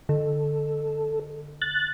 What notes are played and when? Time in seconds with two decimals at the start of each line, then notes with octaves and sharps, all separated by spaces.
0.09 D3 A4
1.62 F#6 A6